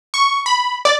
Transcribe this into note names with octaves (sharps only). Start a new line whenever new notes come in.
C#6
B5
D5